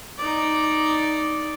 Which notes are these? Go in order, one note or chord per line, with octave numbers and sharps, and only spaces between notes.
D#4 D5